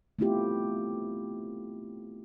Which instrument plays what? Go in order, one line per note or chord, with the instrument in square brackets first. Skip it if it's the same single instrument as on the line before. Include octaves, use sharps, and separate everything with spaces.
[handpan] A3 B3 C4 E4 F4 G4